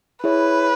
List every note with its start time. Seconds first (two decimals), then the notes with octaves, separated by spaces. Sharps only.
0.24 E4 G#4 B4 C#5